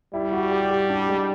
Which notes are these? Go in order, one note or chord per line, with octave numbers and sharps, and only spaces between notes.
G3 E4
F#4
G4
G4
D4
G#3